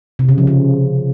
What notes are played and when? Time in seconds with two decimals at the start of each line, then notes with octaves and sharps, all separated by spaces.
0.19 C3
0.29 C#3
0.38 F3
0.47 C#3